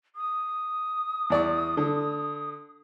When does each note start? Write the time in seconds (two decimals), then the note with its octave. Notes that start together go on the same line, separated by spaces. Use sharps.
0.16 D#6
1.30 E2 D5 C#6
1.77 D3